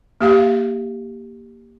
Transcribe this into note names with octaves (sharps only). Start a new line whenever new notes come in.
A#3 G4 F5